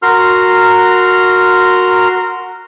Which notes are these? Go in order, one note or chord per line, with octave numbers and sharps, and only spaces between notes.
F#4 A#4 C6 F6